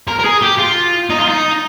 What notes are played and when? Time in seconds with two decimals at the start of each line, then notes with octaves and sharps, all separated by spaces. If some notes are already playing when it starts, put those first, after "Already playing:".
0.08 A#4
0.19 A#4
0.25 G#4
0.42 G4
0.59 F4
1.10 D#4
1.20 F4
1.29 D#4